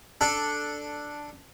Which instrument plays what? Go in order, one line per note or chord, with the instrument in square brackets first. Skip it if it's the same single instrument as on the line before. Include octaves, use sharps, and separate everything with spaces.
[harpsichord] D4 A4